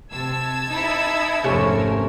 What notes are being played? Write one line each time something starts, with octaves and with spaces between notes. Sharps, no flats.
C3 A5 E6 G#6
D#4 E4
G#1 F2 C3 A3 C#4 A#4